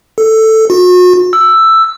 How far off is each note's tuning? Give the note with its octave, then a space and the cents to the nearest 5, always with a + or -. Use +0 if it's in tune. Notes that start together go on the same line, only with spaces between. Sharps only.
A4 +5
F#4 -40
E6 +5